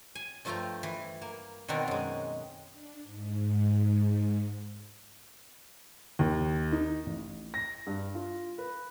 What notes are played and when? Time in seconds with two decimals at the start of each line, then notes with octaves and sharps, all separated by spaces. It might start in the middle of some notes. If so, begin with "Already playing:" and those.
0.15 G#5
0.45 G2 F3 A3 F4 G5 A#5
0.83 E3
1.22 A#3
1.68 B2 D#3 C4 D4 A#4 F#5
1.88 F#2 G#3
2.71 D4
3.04 G#2
6.19 D#2
6.72 D#4
7.06 A1
7.54 A#6
7.87 G2
8.15 F4
8.58 B4